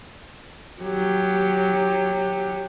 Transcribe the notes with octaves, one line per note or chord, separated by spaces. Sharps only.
F#3 G4